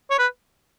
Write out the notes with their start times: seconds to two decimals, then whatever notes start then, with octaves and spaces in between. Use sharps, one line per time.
0.11 C#5
0.18 B4